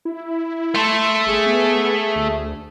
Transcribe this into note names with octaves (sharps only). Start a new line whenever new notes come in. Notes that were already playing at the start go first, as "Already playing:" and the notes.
E4
A3 A4 C6
G1 G#4
B3
D2